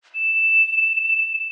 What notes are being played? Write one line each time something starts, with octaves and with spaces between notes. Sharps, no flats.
E7